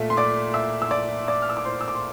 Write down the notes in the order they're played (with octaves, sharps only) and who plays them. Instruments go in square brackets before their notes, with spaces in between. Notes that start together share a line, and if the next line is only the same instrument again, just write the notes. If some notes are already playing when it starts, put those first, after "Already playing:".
Already playing: [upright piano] A#2 A3 E5
C6
D5 D6
E5 E6
E6
D5 D6
D5 D6
F6
E6
D6
C5 C6
E6
D6
C6